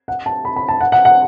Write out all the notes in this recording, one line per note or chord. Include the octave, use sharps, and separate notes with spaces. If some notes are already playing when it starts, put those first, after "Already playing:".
F#5
A5
B5
B5
A5
F#5
F#5
F#5